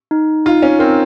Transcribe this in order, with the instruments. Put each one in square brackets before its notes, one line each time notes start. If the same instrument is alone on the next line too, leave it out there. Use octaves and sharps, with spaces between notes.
[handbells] D#4
[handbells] D#4 [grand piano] F4
[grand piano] C#4
[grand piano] C4 [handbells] A#4